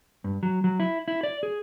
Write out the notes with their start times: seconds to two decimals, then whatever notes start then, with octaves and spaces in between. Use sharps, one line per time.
0.24 G2
0.43 F#3
0.64 F#3
0.80 E4
1.08 E4
1.23 D5
1.43 G#4